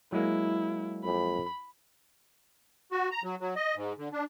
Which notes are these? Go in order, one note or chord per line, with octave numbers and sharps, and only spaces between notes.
F#3 G#3 A#3 E4
F2 B5
F#4
A#5
F#3
F#3
D#5
G#2
D3
D4